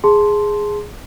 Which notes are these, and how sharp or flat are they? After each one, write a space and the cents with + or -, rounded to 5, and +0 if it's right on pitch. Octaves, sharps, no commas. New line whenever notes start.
G#4 +0 A5 -5 C6 +0